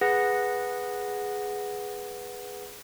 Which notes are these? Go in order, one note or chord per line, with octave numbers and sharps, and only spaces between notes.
G#4 B4 F#5 A#6